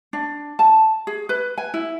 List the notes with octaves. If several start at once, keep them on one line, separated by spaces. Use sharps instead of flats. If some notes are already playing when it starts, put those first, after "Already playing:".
D4
A5
G#4
B4
G#5
E4